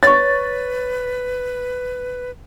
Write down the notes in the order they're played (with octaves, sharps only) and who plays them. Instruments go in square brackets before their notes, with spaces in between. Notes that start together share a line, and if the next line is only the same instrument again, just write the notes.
[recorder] B4 [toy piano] C#5 C#6 [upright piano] A6